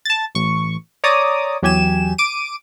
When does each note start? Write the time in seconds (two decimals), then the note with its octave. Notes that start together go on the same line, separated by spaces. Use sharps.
0.05 A5 A6
0.35 A1 C#6
1.04 C#5 D5 A#5 D6 D#6
1.62 E2 F#3 G4 G#5 E7
2.18 D6 D7 D#7